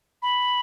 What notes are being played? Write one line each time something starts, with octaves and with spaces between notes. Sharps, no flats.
B5